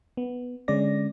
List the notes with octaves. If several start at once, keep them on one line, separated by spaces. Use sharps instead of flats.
B3
D3 G#3 C#4 D5 A#6